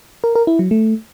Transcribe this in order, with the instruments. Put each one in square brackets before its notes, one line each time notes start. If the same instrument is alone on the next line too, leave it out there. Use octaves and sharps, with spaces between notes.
[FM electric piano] A#4
A#4
E4
F#3
A3